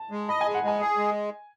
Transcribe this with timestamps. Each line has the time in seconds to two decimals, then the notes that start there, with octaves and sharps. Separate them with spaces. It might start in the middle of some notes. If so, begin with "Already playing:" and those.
Already playing: A5
0.11 G#3
0.29 D#5 B5
0.41 G#3 G#5
0.54 F#5
0.63 G#3 G#5
0.80 G#4
0.97 G#3